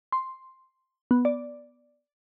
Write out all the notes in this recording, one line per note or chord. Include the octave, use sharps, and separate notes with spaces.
C6
B3
D5